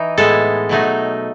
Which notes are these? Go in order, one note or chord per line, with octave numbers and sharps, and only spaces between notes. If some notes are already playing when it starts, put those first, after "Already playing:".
Already playing: E3 D#4
A2 G#3 B3 A4
B2 F#3 A3 D#4